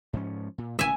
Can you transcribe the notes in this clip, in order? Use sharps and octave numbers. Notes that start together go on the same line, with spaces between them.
G#2 F3 C#4
A#2
A1 C#3 E5 G#5